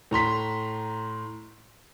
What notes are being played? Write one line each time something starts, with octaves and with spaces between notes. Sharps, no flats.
A2 A#5 C6 B6